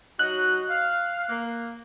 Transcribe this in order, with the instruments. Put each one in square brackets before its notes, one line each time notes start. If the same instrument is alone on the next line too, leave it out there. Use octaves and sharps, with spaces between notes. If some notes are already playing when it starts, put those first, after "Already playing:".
[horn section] F#3 D#4 F#4 [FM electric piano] F#6
[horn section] F5
A#3